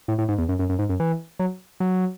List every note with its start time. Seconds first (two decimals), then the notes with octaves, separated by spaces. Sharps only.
0.08 A2
0.18 A2
0.29 G#2
0.38 E2
0.49 F#2
0.59 F#2
0.69 F#2
0.79 G#2
0.89 F#2
1.00 E3
1.39 F#3
1.80 F#3